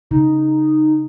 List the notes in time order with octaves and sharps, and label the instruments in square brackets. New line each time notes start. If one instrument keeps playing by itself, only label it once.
[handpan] C#3 [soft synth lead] D#4